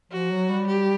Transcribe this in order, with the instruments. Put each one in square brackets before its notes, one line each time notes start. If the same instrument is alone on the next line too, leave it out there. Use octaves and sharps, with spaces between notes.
[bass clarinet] F3 [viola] F#4
[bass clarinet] F#3
G3
[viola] G4